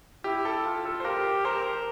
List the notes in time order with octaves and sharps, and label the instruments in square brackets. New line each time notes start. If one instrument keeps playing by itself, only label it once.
[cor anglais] E4 [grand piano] G4
[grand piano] A4
[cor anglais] F4
[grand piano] A4
C5
[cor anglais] G4 [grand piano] A#4
[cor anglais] A#4 [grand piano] C5